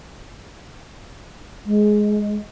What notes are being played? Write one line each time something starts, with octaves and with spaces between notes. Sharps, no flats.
G#3